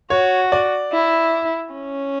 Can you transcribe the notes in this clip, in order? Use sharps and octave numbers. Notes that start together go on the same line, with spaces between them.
F#4 C#5
D5
E4
C#4